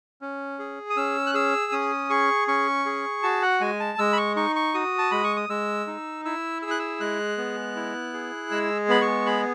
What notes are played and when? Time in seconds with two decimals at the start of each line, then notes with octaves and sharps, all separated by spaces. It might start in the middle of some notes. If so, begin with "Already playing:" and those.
0.21 C#4
0.59 G#4
0.90 D#6
0.97 C#4 E6
1.26 F#6
1.34 G#4 E6
1.72 C#4 D#6
2.10 G#4 C#6
2.48 C#4 C#6
2.86 G#4
3.23 F#4 A5
3.42 F#5
3.61 G#3 G#5
3.80 A5
3.99 G#3 E6
4.13 B5
4.17 C#6
4.36 D#4 C#6
4.56 C#6
4.74 F#4 D#6
4.98 A5
5.11 G#3 B5
5.24 C#6
5.36 D#6
5.49 G#3 E6
5.87 D#4
6.25 E4 E6
6.62 G#4 E6
6.70 F#6
6.79 E6
7.00 G#3 F#6
7.38 B3
7.76 E4
8.13 G#4
8.51 G#3 E6
8.89 B3 B5
9.01 C#6
9.26 G#4 B5